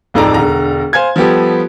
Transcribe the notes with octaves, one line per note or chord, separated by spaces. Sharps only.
D1 F2 D#4 A4 D5 A#5
E1 D3 A#5
C5 F5 G#5 G#6
F3 G3 B3 G4 A4